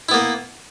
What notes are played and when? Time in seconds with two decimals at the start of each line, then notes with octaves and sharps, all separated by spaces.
0.09 E4
0.11 B3
0.14 A#3